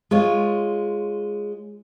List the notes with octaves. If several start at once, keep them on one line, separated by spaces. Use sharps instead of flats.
G#3 F4 C#5